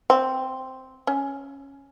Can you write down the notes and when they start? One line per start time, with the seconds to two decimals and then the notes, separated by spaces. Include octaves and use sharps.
0.10 C4
1.07 C#4